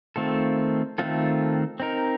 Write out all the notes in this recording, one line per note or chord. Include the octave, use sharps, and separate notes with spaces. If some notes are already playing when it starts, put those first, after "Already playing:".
D#3 A3 C4 F4 A4
D#3 A3 C4 F4 A4
C4 D#4 A#4